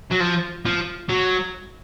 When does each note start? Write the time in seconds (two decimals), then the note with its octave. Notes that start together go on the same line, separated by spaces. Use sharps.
0.11 F#3
0.21 F3
0.65 F3
1.09 F#3